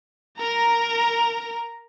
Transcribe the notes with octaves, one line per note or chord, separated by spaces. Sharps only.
A#4 A#5